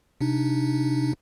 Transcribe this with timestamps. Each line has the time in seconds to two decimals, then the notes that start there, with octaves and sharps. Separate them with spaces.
0.21 C3 D4 D#4